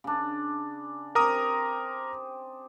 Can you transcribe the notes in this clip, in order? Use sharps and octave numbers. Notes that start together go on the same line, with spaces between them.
C#3 D4
C4 G4 A#4 A#5 D#6